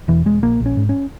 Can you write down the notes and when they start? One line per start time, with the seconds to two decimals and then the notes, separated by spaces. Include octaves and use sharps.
0.08 E1 E3
0.26 E1 G#3
0.42 A#1 A#3
0.60 A#1
0.66 C#4
0.77 G#2
0.89 C#4